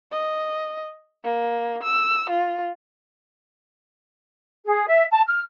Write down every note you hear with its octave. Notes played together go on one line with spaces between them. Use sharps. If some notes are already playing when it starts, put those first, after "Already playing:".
D#5
A#3
E6
F4
G#4
E5
A5
F6